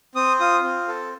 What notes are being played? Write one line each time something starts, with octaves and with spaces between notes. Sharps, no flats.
C4 D#6
F4 D#6
C4
A4